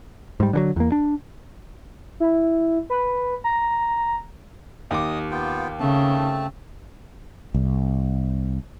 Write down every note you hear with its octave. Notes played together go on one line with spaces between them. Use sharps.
G#2 G3
D3 E3 F#3
E2 A#3
D4
E4
B4
A#5
D#2 D#5 D6 D#6
B3 F4 G5
C#3 A3 C4 A5
C2